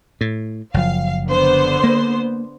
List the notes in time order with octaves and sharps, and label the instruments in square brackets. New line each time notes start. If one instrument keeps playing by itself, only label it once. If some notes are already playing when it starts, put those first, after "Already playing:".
[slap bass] A2
[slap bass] F#1 F3 [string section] F5
[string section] D3 B3 C5
[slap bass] A#3